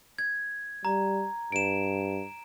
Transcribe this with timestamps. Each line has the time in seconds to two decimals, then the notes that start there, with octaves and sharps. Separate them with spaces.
0.19 G#6
0.85 G3 A#5
1.52 G2 D7 E7